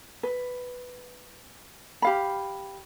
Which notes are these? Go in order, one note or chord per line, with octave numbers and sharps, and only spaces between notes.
B4
G4 F5 B5